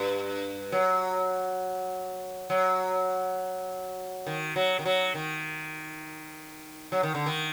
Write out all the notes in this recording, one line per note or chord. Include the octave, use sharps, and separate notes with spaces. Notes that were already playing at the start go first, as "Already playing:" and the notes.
Already playing: G2
F#3
F#3
D#3
F#3
D#3
F#3
D#3
F#3
D#3
D3
D#3